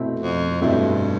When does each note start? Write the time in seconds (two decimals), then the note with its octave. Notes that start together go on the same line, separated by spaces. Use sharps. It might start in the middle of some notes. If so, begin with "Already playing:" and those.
Already playing: B2 A3 C4 E4
0.20 F2
0.61 G2 B2 A3 C4 E4